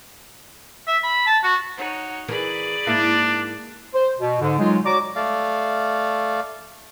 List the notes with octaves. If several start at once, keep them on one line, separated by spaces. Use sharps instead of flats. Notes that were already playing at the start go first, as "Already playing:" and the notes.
E5
B5
A5
F#4
D#4 F#4 C#5
E3 G#4 A#4 D5 B5
G#2 A#3 D4 E4
C5
B2
G#2 D3
F#3 G#3 D#4 F4
F#4 C#5 D5 A#5 D6
A3 D5 F5